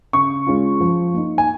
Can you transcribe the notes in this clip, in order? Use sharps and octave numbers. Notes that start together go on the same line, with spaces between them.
C#3 C#6
G#3 C#4 F4
F3
A#3 D#4
G#5